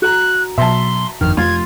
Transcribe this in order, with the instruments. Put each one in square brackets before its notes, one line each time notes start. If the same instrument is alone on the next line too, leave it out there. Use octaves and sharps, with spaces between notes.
[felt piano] F#4 A#5 [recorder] F#6
[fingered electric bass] B2 F#3 [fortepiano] E5 A5 [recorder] C6
[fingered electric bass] G1 F2 D3 [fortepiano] D#3 [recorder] F6
[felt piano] F1 C6 [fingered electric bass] F2 [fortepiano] F4 [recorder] G#6